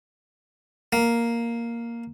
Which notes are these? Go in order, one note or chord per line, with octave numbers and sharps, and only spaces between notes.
A#3